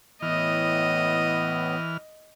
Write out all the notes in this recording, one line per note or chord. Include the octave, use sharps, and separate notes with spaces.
A2 E3 B3 D#5 F6